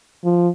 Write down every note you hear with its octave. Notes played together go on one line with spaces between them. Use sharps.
F3